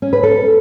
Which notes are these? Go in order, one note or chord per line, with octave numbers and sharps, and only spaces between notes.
C#4
B4
A4